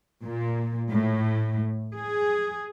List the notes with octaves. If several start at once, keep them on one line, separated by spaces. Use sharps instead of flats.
A#2
A2
G#4